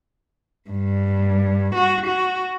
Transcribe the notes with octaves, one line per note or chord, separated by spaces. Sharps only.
G2
F#4
F#4